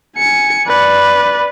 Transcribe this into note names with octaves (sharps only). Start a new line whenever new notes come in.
G#5 C#7
B4 D5